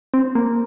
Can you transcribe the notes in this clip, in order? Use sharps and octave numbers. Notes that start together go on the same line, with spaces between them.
C4
A#3